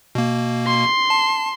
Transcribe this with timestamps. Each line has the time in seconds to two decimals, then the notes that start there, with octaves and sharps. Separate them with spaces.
0.15 B2 A#3
0.67 C6
1.10 A5